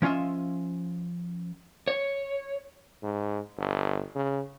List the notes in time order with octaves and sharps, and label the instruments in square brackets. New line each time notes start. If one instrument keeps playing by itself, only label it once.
[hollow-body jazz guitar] F3 C#4 F4 D#5 E5
[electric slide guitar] C#5
[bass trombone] G#2
G1
C#3